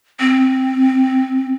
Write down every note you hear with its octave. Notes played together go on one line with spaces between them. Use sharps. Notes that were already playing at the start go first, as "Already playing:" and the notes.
C4